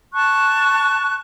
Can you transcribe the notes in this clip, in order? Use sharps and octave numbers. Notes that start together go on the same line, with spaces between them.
A5 C#6 F#6